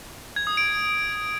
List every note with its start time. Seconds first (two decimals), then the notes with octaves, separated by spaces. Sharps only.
0.36 G#6
0.47 D#6
0.57 D7